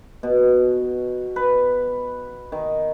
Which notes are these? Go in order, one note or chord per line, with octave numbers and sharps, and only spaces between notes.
B2
B4
D#3